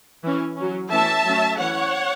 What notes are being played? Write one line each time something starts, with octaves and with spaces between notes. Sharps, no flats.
E3 C#4
F#3 C#4
E3 A3 C#4 E5 A5
F#3 A3 C#4
E3 C#4 C#5 F#5